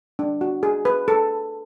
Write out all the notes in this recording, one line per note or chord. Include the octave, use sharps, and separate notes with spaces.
D4
F#4
G#4
B4
A4